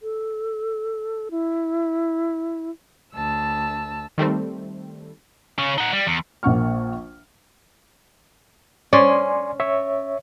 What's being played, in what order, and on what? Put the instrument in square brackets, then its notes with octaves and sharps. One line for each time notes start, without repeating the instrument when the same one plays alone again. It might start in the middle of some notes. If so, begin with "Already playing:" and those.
[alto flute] A4
E4
[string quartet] D2 A5 E6
[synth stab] D#3 G3 A3 C4
[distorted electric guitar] C#3 C#4
D#4 F#5
G3
E2
[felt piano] A#1 A#3 F#5 C#6 F6
[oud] C#4 [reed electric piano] D5 G#5 C6
[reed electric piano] C#5 E5